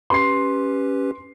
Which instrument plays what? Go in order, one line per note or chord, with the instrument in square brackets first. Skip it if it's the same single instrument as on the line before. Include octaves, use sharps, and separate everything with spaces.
[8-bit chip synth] C#4 G4 B4 [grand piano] C6 C7